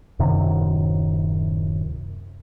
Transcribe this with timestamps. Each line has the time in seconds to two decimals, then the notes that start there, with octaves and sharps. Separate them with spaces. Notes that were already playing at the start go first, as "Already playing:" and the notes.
0.19 D1 F#2 C3 D#3